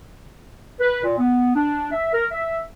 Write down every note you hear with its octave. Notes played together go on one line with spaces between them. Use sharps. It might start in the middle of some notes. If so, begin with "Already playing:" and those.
B4
A#2
B3
D4
E5
A#4
E5